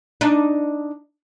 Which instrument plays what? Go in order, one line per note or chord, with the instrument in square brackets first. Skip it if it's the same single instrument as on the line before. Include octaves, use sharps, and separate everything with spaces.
[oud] D4 D#4